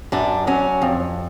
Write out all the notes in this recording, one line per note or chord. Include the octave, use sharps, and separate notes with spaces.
F#2 D4
F#3 C#4
F2